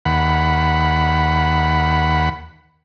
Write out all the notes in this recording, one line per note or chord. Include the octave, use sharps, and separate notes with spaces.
D#2 F#5 B5